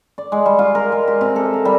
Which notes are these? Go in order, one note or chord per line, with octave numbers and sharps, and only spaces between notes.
D5
G#3
G3
F4
A#4
G#3
G4
C3
A4
A#4
G3